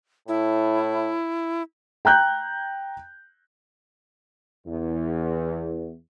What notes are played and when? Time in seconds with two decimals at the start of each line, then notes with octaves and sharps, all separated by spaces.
0.28 A2 E4
2.05 G5 A#5 F#6 G6
4.66 E2